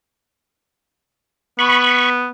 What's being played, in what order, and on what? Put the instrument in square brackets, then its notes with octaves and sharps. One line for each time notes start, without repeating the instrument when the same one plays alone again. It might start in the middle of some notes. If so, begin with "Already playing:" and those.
[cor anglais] B3 [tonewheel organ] B5 C#6